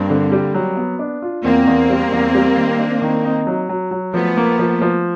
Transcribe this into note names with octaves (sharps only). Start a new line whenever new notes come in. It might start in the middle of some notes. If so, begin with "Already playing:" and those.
Already playing: G2 A#3 C4
D3
G3
F#3
B3
D4
F4
E2 A#3 C4
E2
G3
E2
G3
D#3
D4
D#3
D#4
F#3
F#3
F#3
F3 A3 B3
A#3
F3
F3